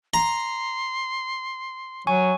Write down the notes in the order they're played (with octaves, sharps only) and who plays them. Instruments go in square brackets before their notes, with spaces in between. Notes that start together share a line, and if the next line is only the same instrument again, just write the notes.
[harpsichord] A#5 [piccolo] C6
[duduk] F#3 [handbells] G#5 C#6